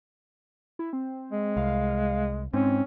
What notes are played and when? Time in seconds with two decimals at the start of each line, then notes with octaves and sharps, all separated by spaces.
0.79 E4
0.93 C4
1.32 G#3
1.57 C2 F5
2.53 G#2 C4 C#4